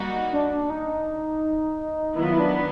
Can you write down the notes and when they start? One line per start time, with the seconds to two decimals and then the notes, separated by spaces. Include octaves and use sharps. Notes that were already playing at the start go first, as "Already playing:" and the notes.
Already playing: G3 A#3 D#4 F#4
0.33 D4
0.70 D#4
2.16 D#3 F#3 B3 E4
2.24 F4
2.32 E4
2.40 D4